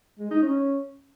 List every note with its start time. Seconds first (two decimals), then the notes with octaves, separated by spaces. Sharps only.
0.19 G#3
0.31 D#4
0.42 C#4